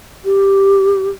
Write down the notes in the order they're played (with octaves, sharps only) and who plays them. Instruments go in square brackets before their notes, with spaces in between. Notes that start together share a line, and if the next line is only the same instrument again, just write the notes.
[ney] G4